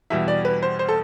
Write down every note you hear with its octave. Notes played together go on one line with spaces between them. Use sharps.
E2 B2 G3 E5
D5
B4
C5
C5
A4